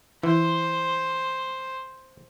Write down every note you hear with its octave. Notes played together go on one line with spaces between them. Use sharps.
E3 C5